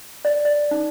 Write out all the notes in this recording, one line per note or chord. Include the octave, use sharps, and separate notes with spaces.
D5
D5
D#4